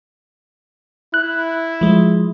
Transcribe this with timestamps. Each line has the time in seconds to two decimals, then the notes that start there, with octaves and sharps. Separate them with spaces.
1.14 E4 F#6
1.81 F3 G#3